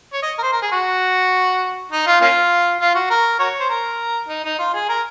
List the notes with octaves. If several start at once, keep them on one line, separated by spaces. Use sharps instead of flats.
C#5
D#5
A#4
C5
A#4
G#4
F#4
D#4
F4
A#3 C#4 F4
F4
F#4
A#4
F#4 A#4 C#5
C5
A#4
D#4
D#4
F4
G#4
A#4